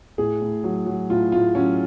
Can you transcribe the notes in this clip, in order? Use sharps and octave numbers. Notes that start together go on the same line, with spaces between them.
A2 G#4
A2
F#3
F#3
A2 F4
A2 F4
F#3 C#4